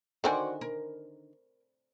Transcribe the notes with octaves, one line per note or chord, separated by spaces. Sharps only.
D3 D#3 F#4 C5 D5 G#5
A#4